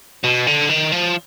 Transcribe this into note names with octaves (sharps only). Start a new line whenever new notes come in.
B2
D3
D#3
F3